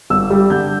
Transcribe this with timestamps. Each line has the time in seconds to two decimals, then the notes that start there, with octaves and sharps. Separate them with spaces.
0.10 G1 E6
0.30 G3
0.50 D3 G6